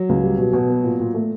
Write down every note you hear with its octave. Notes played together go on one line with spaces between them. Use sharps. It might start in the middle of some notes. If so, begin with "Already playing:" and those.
Already playing: F#3
C#2
G3
B2
B2
B3
A#2
A#2
A3